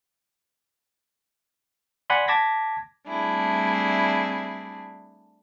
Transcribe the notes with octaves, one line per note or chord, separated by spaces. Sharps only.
D5 F#5 G#5 B5 C6
A5 D6 G#6 A#6 B6
G3 A3 C4 D4 E4 G#4